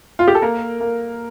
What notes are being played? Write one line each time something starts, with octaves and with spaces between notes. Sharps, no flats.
F4
G4
A4
A#3 A#4
A#3